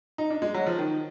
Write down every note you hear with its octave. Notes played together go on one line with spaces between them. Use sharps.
D#4
D4
G#3
F#3
F3
D#3